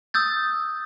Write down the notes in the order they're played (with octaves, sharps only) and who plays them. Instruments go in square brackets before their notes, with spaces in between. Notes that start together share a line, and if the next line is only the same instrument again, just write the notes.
[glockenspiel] D#6 E6 G6 A6